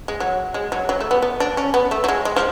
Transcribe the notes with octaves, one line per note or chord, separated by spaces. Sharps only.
G#3
F#3
G#3
F#3
F#3
A3
B3
B3
D4
C#4
B3
A3
F#3
G#3
G#3
F3